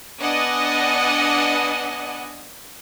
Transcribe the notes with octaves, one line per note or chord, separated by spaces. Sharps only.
B3 D4 D5 D#5 F#5 G#5